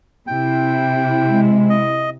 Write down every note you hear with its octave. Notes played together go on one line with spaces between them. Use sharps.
C3 E4 G5
G#3
D#5